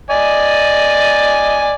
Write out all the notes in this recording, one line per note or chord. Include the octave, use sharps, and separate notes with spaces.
D5 D#5 G#5